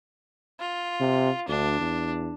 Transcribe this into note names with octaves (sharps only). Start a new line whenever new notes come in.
F4
C3
D2 D4
E2